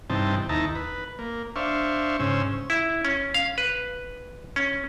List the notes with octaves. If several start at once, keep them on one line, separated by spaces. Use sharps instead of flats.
G2 C3 E3 C4 D#4 A5
D#2 D#4 E4 A5 A#5
B4
A#3
D4 C5 E5 F5 C#6
G#2 C#3 C#4 C5 E6
E4
C#4
F5
B4
C#4